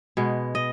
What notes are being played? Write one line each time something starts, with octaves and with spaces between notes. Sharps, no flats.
B2 G#3 B3
D#5